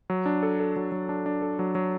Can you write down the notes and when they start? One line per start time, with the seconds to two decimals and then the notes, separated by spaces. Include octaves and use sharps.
0.10 F#3
0.26 D4
0.43 A4
0.60 A4
0.76 F#3
0.92 F#3
1.09 D4
1.26 D4
1.42 A4
1.59 F#3
1.75 F#3